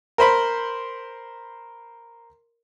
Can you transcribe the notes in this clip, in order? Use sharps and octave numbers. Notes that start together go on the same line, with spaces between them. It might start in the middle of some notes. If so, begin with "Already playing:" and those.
A#4 C5 B5